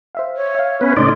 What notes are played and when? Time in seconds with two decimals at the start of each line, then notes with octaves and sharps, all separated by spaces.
0.15 C5 E5 F5
0.36 C#5
0.55 E5 F5
0.81 B3 C#4 B4
0.97 A2 C#3 A3 C#4 D#4 D5 C6